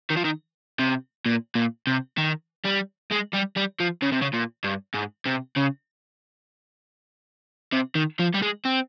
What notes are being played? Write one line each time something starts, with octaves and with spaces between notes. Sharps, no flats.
D#3
F3
D#3
C3
A#2
A#2
C3
D#3
G3
G#3
G3
G3
F3
C#3
C3
C#3
A#2
G2
G#2
C3
C#3
C3
D#3
F3
G3
G#3
C4